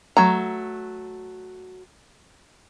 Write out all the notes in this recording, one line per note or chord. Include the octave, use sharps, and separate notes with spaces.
F#3 A3 A#5